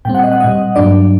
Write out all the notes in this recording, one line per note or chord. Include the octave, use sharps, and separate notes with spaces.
A#2 G3 C4 G5
F#5
D#5
F#5
A#2 G3 C4 D#5
G2 F#3 A#3 D4 D5